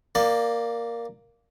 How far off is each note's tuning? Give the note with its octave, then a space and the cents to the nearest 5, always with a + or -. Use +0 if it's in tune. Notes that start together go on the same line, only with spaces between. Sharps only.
A#3 +0 D5 +10